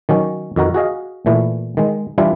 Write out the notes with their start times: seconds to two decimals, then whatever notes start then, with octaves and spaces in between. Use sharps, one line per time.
0.09 D#3 F#3 C#4
0.56 F2 D#3 F#4 A#4
0.74 F#4 G#4 D#5 F5
1.26 A#2 E3 A3
1.77 D#3 G#3
2.18 E3 G3 D4 E4 F4